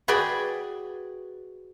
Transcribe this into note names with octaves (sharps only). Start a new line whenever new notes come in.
F#4 G#4 B4 D5 G5 G#5